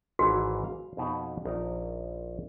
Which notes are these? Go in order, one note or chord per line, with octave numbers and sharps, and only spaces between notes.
G#1 G#2 E3 F#4
F5
F2 B2 D#4
A#1 D#4 A#4